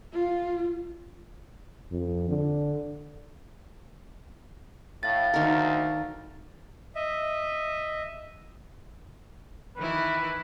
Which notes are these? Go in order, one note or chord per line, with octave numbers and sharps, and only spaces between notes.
F4
F2
D3
A2 F5 A6
D2 D#3 A#4
D#5 E5
D#3 E3 E4 B4